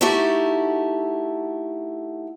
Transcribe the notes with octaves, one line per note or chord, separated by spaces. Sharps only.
A3 D#4 E4 F#4 G4 A4